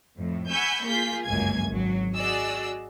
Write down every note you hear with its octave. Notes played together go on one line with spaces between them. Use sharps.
F2 A2
F#5 G#5 B5 C#6 E6 G6
A#3 F4 G#4 G6 B6
G1 C#2 F#2 A#3 G#5 G#6
G#1 F#3
F#4 G#4 D5 D#5 E6